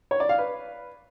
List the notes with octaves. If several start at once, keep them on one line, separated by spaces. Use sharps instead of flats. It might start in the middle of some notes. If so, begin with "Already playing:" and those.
C#5
D5
F5
B4